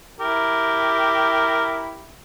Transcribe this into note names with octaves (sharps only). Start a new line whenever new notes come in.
E4 G4 A#4